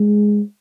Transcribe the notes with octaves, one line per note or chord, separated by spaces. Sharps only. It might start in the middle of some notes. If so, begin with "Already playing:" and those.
Already playing: G#3